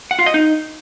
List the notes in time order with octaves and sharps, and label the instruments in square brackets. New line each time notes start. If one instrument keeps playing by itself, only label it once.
[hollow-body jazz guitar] F#5
F4
D#5
D#4